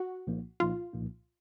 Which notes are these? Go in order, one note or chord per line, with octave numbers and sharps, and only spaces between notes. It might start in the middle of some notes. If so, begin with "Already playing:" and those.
Already playing: F#4
C2 A#2 F3 A#3 D#4
C2 A#2 F3 A#3 D#4 F4
C2 A#2 F3 A#3 D#4